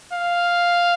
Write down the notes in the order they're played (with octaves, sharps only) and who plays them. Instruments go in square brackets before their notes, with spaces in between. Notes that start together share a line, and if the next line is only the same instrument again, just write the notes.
[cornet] F5